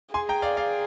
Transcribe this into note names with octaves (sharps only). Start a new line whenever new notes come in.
G#4 G#5 C6
G5 A#5
D5 F5
D5 F5